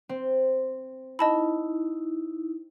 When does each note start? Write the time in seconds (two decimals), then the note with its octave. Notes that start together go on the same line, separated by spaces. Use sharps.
0.09 C4
1.19 D#4 E4 D#5 A5 B5